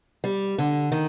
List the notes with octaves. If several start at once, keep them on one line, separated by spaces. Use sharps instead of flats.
G3
D3
D#3